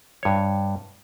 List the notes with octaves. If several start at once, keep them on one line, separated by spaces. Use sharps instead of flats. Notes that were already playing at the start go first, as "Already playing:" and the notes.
G2 C#5